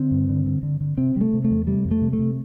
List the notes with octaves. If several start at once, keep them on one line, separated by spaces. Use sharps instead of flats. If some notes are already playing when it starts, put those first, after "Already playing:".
Already playing: D3 C4
G2
D3
D3
D3
D3
C3 C4
C3 G3
A3
C3
A3
E2
C3 G3
F2
A3
C3
A3
C3